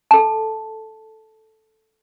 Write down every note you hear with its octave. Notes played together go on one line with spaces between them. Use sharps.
A4 A5